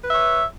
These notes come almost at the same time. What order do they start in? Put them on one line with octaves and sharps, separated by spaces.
B4 E5 C#5